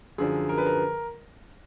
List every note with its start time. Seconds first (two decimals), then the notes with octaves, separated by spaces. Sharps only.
0.18 F#2 D3 F3 G#4
0.49 A#4
0.58 B4
0.66 A#4